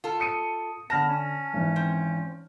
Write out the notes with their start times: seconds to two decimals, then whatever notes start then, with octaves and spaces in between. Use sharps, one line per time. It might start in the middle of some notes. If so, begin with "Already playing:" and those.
0.04 F4 A4
0.20 D#6 C#7 D#7
0.90 D3 B3 A5 F6 A#6
1.09 C#4
1.54 G#1 E3
1.76 C4